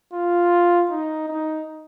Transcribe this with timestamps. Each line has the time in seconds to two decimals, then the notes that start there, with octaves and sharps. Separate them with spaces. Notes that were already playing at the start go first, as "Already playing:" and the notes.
0.13 F4
0.90 D#4
1.28 D#4